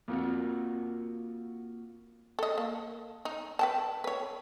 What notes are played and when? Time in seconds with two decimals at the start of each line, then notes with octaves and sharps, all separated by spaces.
0.08 F2 A#3 F4 F#4
2.39 A4 D#5
2.58 A#3
3.25 D#4
3.59 B4 G5 A5
4.04 B4 C#5